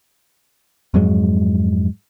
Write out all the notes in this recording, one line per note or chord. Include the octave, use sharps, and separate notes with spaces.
F2 G#2 F#3 G#3